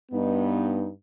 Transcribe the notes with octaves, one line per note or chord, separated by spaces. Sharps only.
G2 B3 D#4